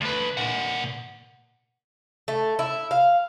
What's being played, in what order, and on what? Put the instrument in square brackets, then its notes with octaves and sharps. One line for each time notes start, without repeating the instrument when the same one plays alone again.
[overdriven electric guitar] D2 B4
A#2 F#5
[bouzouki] A3
E4
F5